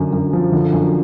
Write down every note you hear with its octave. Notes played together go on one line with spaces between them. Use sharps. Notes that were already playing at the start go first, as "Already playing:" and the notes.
Already playing: F#2 D3
F#2
F3
D3
F#2